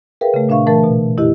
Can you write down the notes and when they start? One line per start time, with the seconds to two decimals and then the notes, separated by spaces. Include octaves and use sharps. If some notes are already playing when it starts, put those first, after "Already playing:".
0.21 G#4 A#4 B4 E5 F5 G5
0.34 C#3 A3
0.49 A#2 D4 E5 F5 C#6
0.67 E3 A3 A#4 A5 A6
0.84 B2
1.17 F#2 D3 E4 G4 D#5